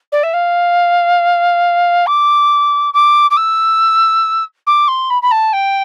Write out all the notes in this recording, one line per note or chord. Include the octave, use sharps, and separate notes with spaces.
D5
E5
F5
D6
D6
D6
E6
D6
C6
B5
B5
A5
G5